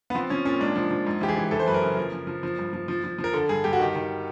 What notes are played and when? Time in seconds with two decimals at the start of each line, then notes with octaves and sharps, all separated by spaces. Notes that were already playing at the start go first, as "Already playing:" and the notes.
0.10 B3
0.15 F3 C4
0.30 F3 C#4
0.45 A#2 C#4
0.60 G#2 D4
0.76 F3
0.91 F3
1.06 G#2
1.21 E3 G4
1.28 G#4
1.36 E3
1.51 E3 A4
1.59 C5
1.66 F#2 B4
1.74 A#4
1.82 C#3
1.97 F3 A#4
2.12 F3
2.27 F3
2.43 F3
2.59 G2
2.73 F3
2.88 F3
3.04 F3
3.18 F3
3.24 A#4
3.33 D3 A4
3.49 G2 G#4
3.64 G2 G4
3.73 F#4
3.79 D#3 G4
3.95 D#3